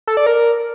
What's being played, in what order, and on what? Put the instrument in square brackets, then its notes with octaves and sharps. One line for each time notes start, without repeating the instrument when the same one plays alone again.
[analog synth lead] A4
D5
A#4